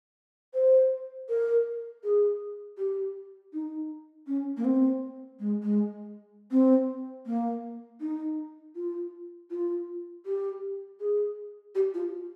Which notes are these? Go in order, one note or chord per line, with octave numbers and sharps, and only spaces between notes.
C5
A#4
G#4
G4
D#4
C#4
A#3
C4
G#3
G#3
C4
A#3
D#4
F4
F4
G4
G#4
G4
F4